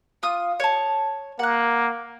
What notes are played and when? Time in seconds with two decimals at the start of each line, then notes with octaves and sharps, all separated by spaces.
0.23 F4 D#6
0.60 C#5 A5
1.39 A#3 F#5 F#6